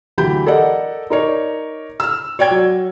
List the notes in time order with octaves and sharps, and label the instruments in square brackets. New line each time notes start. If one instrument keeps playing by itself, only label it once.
[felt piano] D2 E3 F#3 G4 B5 G6
A4 A#4 D5 D#5 F#5
D#4 A#4 C#5 D5
E6 F6
C#5 D5 G5 G#6
F#3